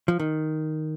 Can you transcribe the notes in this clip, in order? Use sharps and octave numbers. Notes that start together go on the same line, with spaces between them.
F3
D#3